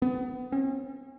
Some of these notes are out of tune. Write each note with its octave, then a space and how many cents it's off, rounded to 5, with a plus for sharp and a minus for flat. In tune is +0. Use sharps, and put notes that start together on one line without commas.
B3 +30
C#4 -40